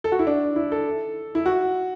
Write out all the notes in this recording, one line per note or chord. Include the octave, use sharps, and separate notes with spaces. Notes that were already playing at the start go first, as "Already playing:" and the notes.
A4
F#4
E4
D4
E4
A4
E4
F#4